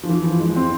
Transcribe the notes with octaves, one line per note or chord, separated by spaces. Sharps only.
F3
E3
F3
G#3
C4